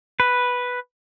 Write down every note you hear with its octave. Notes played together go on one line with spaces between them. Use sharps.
B4